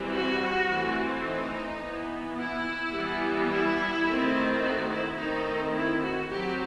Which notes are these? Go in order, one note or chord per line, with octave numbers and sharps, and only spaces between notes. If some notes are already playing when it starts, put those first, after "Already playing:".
Already playing: E3 G3 C4
F#4
E3 A3 C4
D#4
E3 B3
E4
E3 G3 B3
E4
D#3 A3 C4
F#4
E4
D#3 A3 C4 D#4
E4
F#4
F#3 C4 G4